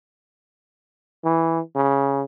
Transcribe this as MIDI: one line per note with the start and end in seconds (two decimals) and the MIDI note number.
1.25 1.60 52
1.76 2.23 49